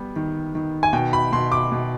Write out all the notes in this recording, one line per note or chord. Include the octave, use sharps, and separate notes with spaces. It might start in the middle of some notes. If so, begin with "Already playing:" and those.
Already playing: G3 B3
D#3
D#3
G#5
B2 G5
B5
B2 C6
D6
B2